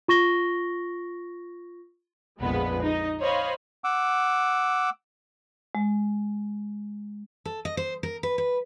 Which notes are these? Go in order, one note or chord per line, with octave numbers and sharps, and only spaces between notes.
F4 C#6 A#6 G7
A#1 F2 G#3 B3 B4
D#4 D#5
C5 C#5 D#5 F5 B5
F#5 D6 E6
G#3
A4
D#5
C5
A#4
B4
B4